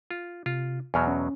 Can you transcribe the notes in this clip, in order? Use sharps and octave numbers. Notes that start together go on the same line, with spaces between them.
F4
C3 F4
E2 B2 F#3 G#5 A5 F6
C#4